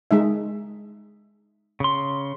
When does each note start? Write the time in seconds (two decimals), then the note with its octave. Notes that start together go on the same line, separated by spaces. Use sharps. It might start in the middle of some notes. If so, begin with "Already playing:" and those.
0.11 G#3 D#4 E5
1.80 C#3 C6